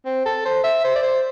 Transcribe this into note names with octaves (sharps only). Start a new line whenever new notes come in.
C4
A4
C5
E5
C5
D5
C5